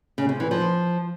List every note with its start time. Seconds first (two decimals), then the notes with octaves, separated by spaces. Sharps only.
0.18 C#3
0.29 C3
0.40 E3
0.51 F3